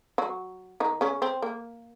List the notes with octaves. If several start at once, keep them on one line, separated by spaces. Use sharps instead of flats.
F#3 F#4
D#3 D#4
C#3 C#4
C4
A#3